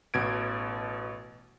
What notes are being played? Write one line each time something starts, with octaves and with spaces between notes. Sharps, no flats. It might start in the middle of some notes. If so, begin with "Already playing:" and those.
A1 B2 G#6 D7